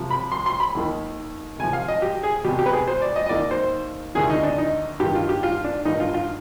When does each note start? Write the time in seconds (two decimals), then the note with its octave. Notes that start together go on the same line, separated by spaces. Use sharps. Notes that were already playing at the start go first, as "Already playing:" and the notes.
Already playing: C2 C3 F3
0.11 B5
0.32 C6
0.46 C6
0.60 B5
0.75 D#2 D#3
1.59 C2 C3 F3 G#5
1.73 F5
1.88 D#5
2.02 G4
2.23 G#4
2.44 B2 G4
2.49 C2
2.59 G4
2.66 B4
2.73 G#4
2.88 C5
3.02 D5
3.16 D#5
3.26 D#5
3.29 D#2 D#3 D5
3.51 C5
4.15 D2 C3 D#3 G#4
4.30 D#4
4.43 D4
4.58 D#4
5.00 G2 G4
5.04 D#3
5.15 F4
5.29 G4
5.43 F4
5.64 D4
5.85 G2 D#3 D#4
6.00 F4
6.14 F4